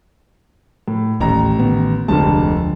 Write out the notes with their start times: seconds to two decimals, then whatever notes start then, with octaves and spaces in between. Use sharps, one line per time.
0.88 A2
1.20 D#1 A1 A#5
1.59 D#3 B3
2.08 F1 D2 D3 F3 G#3 A5